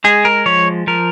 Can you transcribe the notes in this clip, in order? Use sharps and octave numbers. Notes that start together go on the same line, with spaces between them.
G#3 G#4
A#4
F3 C#5
F3 A#4